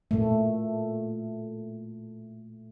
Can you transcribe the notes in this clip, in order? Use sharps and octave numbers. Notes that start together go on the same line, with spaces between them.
A#2 A3